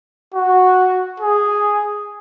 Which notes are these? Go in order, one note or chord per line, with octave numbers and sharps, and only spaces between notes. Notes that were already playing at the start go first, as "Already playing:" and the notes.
F#4
G#4